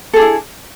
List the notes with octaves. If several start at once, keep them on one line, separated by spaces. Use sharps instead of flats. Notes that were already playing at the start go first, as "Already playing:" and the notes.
D4 E4 G#4 A4